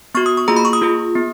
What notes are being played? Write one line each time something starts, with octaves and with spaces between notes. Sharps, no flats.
B3 F#4 C#6
D#6
C#6
A#3 F4 G#4 A#5
B5
C#6
D#6
A#3 F4 G#4
B3